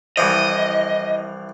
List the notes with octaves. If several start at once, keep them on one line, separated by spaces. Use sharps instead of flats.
C2 E3 F3 D#5